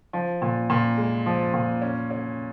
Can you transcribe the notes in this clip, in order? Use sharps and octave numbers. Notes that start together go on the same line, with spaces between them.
F3
A#2
A#2
G#3
F3
A#2
C#4
C#4